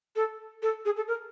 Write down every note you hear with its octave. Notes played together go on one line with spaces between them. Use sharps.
A4
A4
G#4
A4
A#4